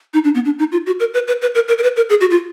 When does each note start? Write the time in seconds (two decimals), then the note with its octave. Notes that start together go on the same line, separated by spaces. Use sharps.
0.14 D#4
0.24 D4
0.35 B3
0.45 D4
0.59 D#4
0.72 F4
0.86 F#4
1.00 A#4
1.14 B4
1.28 B4
1.42 B4
1.55 A#4
1.68 A#4
1.78 A#4
1.83 B4
1.96 A#4
2.10 G#4
2.21 F#4
2.30 F4